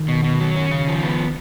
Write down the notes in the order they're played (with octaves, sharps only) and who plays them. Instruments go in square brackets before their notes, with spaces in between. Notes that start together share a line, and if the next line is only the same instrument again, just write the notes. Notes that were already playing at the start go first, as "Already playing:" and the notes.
Already playing: [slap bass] D#3
[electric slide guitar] B2
B2
F#3
C#4
C#3
F3
B3